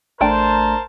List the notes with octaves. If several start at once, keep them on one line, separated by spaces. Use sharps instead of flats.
A1 A3 D4 A#4 C5 G5 A5